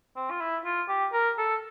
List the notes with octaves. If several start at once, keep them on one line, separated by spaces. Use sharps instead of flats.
C4
F4
E4
F4
G4
A#4
A4